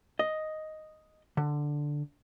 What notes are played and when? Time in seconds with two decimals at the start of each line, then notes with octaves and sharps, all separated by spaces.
0.19 D#5
1.37 D3